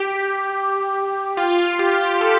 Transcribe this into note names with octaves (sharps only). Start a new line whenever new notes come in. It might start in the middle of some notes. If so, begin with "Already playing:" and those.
Already playing: G4
F4
G4
A4